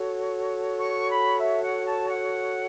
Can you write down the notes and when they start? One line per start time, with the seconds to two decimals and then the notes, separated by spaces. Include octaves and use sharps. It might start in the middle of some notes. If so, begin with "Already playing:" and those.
Already playing: F#4 A4 C#5
0.79 C#6
1.09 B5
1.39 E5
1.62 F#5
1.85 A5
2.07 F#5